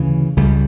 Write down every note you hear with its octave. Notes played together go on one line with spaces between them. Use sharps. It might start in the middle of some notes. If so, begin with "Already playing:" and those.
Already playing: D2 C#3 E3
C#2 C#3 G3